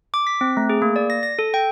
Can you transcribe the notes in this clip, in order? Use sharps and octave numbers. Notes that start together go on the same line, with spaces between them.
D6
B6
C4
A3
G#4
A#3
D5
A#6
A#6
A4
G5